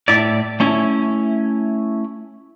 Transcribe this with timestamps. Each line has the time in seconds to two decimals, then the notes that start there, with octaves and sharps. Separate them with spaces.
0.08 A2 E4 D5
0.60 A3 C#4 E4